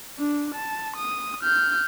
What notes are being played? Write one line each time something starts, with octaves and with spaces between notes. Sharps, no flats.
D4
A5
D#6
F6 G6